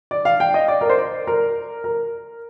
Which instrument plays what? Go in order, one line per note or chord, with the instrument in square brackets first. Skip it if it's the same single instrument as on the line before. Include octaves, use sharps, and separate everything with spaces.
[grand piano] D5
F5
G5
D#5
D5
A#4
C5
D5
A#4
A#4